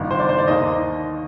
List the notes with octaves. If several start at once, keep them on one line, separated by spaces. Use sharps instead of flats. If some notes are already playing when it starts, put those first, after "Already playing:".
Already playing: G1 G2 D#3
C5
D5
C5
D5
D#2 D#3 A#3 D#4 D#5